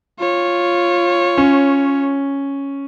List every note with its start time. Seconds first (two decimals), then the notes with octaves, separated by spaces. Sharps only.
0.20 F4 C#5
1.38 C#4